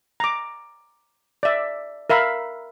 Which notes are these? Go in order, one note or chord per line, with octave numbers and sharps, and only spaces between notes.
A#5 D6
D5 E5
A#4 E5 F5 B5